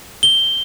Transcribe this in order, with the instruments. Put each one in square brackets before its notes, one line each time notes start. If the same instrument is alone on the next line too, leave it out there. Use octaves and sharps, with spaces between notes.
[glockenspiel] G7